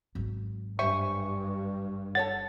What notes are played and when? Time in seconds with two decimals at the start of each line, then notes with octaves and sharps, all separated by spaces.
0.15 G#1 F#3
0.79 G2 C5 E5 G#5 C#6
2.15 A4 C#5 F#5 A6